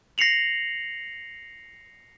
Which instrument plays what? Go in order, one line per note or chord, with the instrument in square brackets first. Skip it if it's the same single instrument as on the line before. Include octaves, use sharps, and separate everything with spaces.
[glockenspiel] A#6 C7 C#7 F7 F#7